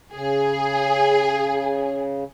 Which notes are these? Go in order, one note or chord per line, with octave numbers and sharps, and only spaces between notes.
C#3 G#4